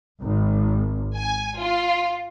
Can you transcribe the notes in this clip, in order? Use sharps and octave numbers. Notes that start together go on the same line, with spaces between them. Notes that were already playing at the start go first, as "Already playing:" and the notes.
G#1
G#5
F4